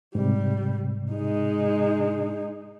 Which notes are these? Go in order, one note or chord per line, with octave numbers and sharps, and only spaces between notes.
G#2 C3 G3
G#3 D#4